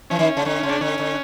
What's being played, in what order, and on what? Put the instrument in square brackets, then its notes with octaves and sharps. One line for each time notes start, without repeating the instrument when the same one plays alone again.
[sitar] E3 [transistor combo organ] C#4
[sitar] D#3
C#3
[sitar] D3 [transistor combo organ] C#4
[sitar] C#3
[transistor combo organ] D4
[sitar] D3 [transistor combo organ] C#4
[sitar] D3